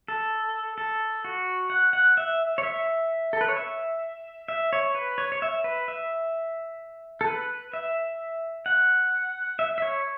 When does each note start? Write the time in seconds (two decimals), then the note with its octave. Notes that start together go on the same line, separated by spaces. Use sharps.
0.08 A4
0.78 A4
1.25 F#4
1.70 F#5
1.93 F#5
2.17 E5
2.58 C#5
2.63 E5
3.33 A4
3.41 B4
3.48 C#5
3.57 E5
4.48 E5
4.73 C#5
4.95 B4
5.18 C#5
5.32 C#5
5.42 E5
5.64 B4
5.88 E5
7.21 A4
7.27 B4
7.73 E5
8.66 F#5
9.59 E5
9.78 E5
9.82 C#5